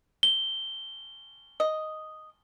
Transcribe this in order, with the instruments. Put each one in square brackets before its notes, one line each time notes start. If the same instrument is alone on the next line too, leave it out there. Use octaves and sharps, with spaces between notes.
[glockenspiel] G7
[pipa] D#5